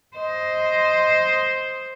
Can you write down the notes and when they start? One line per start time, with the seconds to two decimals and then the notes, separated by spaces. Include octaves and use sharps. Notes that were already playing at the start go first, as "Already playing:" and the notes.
0.17 C5 D#5